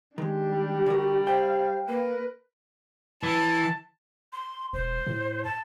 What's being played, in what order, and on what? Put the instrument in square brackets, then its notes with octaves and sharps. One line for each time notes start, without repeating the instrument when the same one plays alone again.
[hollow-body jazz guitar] D#3 G#3 [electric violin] D4 G4
[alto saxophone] G3
[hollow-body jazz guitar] D3 A#4 [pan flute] F#4
[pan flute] C5 [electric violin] F5 [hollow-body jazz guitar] G5
[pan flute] A#3 [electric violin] A#4 B4
[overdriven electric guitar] E3 [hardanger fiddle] A5
[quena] C6
[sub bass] E1 [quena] C5
[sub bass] A2
[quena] A5